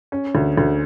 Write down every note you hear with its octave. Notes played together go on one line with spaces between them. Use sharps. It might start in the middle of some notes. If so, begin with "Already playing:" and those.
C#4
D2
D2